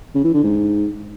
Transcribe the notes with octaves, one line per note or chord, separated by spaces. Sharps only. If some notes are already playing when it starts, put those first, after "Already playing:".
C#3
E3
D3
G#2